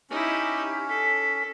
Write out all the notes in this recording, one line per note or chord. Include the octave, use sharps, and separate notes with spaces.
C#4 D#4 E4 G4
A4 B6